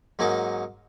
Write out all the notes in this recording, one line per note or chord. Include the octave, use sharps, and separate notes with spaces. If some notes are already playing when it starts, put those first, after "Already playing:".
G#2 F#3 A#3 C#4 D#4 D6